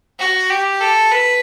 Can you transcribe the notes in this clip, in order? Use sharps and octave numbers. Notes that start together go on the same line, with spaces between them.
F#4
G4
A4
B4